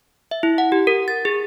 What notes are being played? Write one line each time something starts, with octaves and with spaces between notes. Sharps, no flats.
E5
E4
F#5
G4
A#4
A6
G#4